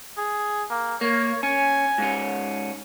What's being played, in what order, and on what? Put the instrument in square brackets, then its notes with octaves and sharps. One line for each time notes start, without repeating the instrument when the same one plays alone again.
[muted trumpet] G#4
A#3
[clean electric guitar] A#3 [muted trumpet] C#5
[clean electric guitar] C#4 [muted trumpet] G#5
[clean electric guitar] G#2 C#4